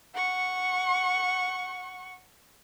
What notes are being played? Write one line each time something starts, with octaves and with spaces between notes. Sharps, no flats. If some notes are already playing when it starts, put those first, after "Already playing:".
F#5 C#6